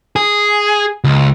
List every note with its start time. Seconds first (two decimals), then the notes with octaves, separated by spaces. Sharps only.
0.16 G#4
1.04 C#2